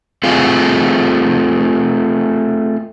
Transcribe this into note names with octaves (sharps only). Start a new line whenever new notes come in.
A3 C4 F4 G#4 A4 F5